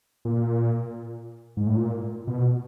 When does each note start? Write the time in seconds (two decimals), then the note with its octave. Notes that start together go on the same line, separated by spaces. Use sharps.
0.25 A#2
1.57 G#2
1.67 A2
1.77 A#2
2.27 B2